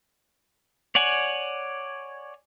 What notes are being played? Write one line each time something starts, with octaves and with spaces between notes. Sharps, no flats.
C#5 D5 F#5 G#5